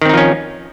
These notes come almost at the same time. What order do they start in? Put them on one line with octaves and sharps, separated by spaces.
D#3 C4 D#4 F3 C#4